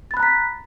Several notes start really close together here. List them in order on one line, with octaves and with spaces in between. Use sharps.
A6 B5 F#6 A#5 B6